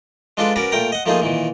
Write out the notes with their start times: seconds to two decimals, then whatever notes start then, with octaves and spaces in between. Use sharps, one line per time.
0.37 G#3 D4 F4 A4 B4 D5
0.56 C#4 F#4 A#4 B4 D5
0.72 A#2 A3 A#4 G5 A#5
0.92 D#5 F#5
1.06 F3 A3 A#3 D#4 F4 G#4
1.22 A#2 D#3 E3